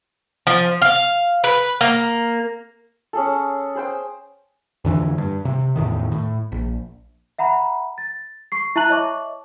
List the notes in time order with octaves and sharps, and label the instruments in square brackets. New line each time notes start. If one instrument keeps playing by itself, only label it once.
[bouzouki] F3
F5
B4
A#3
[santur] C#4 G#4 A4
G#4 C5 G5
[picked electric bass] F2 D3 E3
G2
C3
E2 A2 D#3
A2
A#1
[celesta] E5 F#5 A#5 B5
A6
C#6 C7
E4 E5 A5 A#5 F#6 F#7
C#5 D#5 E5 A5 C#6 D6